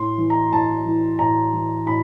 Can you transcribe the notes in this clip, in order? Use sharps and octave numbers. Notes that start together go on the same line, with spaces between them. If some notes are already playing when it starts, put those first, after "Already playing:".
Already playing: A2 C6
E3
A#5
A2 A5
E3
A2 A#5
E3
A2 B5